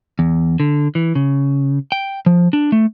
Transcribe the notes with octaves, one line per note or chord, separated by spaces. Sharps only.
E2
D3
E3
C#3
G5
F3
D4
A3